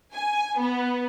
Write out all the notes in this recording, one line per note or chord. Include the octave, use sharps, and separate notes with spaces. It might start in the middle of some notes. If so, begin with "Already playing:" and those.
G#5
B3